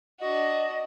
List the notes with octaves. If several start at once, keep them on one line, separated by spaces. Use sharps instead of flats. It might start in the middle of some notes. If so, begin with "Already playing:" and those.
D4 F#4 D#5